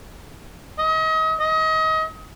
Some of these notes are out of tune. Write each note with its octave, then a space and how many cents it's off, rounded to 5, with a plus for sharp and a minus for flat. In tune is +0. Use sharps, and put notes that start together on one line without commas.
D#5 +35
D#5 +30